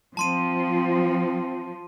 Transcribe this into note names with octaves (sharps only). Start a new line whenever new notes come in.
F3 C4 A5 C6 D#7